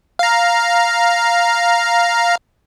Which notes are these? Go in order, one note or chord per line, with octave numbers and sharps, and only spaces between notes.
F5 A#5